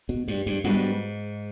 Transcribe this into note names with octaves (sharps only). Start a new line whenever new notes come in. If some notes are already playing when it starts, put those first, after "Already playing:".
B2
G2
G2
G#2 G3 B3 D4 F#4